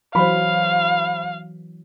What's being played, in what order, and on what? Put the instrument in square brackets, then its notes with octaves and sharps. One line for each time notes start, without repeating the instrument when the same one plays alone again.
[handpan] E3 F#3 [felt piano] C5 B5 [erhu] F5